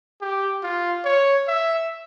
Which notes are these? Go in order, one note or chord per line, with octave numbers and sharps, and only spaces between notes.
G4
F4
C#5
E5